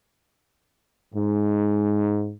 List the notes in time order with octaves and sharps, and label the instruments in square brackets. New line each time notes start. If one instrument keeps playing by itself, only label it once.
[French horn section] G#2